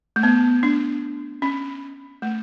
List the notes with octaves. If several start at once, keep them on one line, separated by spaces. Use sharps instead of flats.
A3
B3
D4
C#4
A3